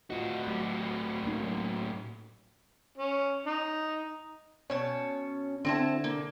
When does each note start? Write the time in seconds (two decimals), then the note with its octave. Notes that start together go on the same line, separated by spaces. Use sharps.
0.10 A2 F4 F#4 D#5
0.47 F#3 A3 G4
1.24 A#3 C#4 D#4
1.43 F#3
2.98 C#4
3.47 D#4
4.70 B2 C#4 C#5 A5
5.65 D3 C4 E4 A5
6.04 A#3